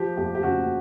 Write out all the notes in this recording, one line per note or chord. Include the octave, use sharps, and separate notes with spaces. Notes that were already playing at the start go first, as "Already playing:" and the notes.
Already playing: F3 G4
F2 G4
G4
C#3 F#4